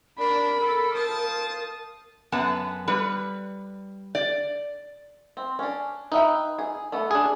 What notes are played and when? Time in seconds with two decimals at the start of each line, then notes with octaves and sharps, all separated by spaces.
0.19 D4 A#4 B5
0.60 A4
0.95 F4 C5 A5 D#6
2.32 F#2 B3 A5
2.88 G3 B4
4.15 D5
5.37 C4
5.59 C#4 D4
6.12 D#4 B4 E5 G5
6.59 G#4
6.92 A3 B3
7.11 D4 G#4